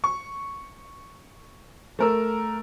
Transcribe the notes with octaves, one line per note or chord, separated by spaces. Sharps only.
C#6
A3 A#4 E6